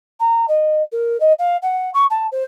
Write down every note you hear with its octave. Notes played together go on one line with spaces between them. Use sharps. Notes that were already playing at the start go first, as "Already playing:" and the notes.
A#5
D#5
A#4
D#5
F5
F#5
C#6
A5
C5